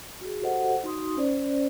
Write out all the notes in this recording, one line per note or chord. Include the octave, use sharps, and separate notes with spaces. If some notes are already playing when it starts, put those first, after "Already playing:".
F#4 G#4
F#4 G4 A4 C5 D#5 F#5
D#4 F#4 C6 D#6
C#4 C5 D5